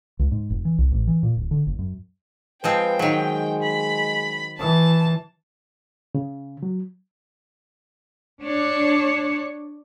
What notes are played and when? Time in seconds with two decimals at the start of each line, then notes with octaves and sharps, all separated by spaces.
0.19 C#2
0.31 G#2
0.50 F1
0.65 E3
0.78 C2
0.91 A1
1.07 E3
1.23 A#2
1.37 D1
1.51 D3
1.67 F#1
1.79 F#2
2.64 F3 G#3 C4 B4 G5
2.99 D#3 F#3 G#3
3.63 B5
4.59 E3 A5
6.15 C#3
6.63 F#3
8.42 D4 C#5